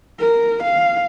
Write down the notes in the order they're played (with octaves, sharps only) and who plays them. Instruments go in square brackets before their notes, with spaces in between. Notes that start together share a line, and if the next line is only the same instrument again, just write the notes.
[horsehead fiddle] A#4
F5